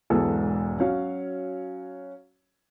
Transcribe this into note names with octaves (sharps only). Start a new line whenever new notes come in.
E1 B1 G#2 E3 G#4 A4
F#3 C#4 F#4 C#5 F5